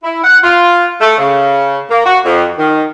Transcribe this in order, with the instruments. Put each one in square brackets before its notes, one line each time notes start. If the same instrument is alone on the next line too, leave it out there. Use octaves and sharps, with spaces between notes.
[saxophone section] E4
F#5
F4
A3
C#3
A#3
F#4
F2
D#3